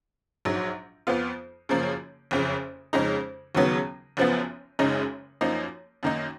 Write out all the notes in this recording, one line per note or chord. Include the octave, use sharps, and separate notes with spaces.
A#1 G#2 F#3
F2 F3 B3 F4
F#2 C#3 F3 A#3
F#1 F2 C#3
F2 C#3 G#3 D#4
D#2 C#3 F#3 B3
F#1 F#2 F3 B3
F#1 F#2 C#3 G#3 D#4
F#2 F3 A#3 D#4
F#2 D#3 A#3 D#4